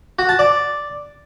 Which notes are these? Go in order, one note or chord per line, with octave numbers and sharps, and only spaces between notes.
F#4
A5
D5